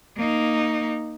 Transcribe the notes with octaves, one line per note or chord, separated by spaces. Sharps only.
A#3 D#4